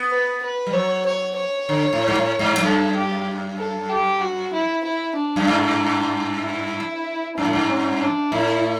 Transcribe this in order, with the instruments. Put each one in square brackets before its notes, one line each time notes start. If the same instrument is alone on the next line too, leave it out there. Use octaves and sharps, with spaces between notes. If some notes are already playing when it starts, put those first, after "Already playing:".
Already playing: [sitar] B3
[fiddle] B4
B4
[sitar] G3
[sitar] F#3 [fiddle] C#5
[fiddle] C#5
C#5
[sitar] D3
A2
G2
A2
G2
G2
[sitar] F#2 [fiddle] A4
[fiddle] G4
A4
G4
F#4
E4
E4
D4
[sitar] F#2
G2
[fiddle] E4
[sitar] G2 [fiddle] D4
[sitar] A2
G2
[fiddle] C#4
D4
[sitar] A2 [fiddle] E4